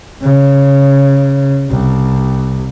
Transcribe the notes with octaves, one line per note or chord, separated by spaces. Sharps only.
C#3
C2